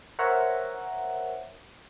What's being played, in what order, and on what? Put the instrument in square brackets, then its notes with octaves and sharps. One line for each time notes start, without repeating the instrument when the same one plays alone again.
[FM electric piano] A#4 C5 C#5 E5 F#5 A#5